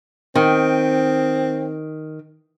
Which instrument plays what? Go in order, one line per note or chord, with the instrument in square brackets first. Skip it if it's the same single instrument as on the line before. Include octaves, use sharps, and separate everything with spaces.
[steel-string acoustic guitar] D#3 [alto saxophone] C4